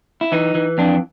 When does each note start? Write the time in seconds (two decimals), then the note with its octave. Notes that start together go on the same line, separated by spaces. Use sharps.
0.21 E4
0.32 E3 D#4
0.55 E3
0.78 F2 D4